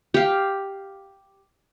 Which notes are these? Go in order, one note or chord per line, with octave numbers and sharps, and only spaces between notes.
G4 F5